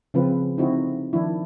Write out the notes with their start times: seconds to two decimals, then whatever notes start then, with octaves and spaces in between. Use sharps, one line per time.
0.14 C#3 F3 C4 F4 B4
0.58 D3 C4 D#4 E4 F#4
1.13 D#3 F3 D4 E4